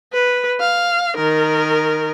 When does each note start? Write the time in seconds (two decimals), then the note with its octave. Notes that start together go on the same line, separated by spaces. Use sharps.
0.13 B4
0.60 F5
1.16 D#3 A#4